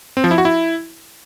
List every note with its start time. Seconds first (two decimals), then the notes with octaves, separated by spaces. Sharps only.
0.17 C4
0.24 F3
0.31 E4
0.38 F#4
0.45 E4